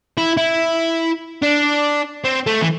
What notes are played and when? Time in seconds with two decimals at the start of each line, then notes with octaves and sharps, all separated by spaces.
0.17 E4
0.37 E4
1.42 D4
2.24 C4
2.46 A3
2.61 E3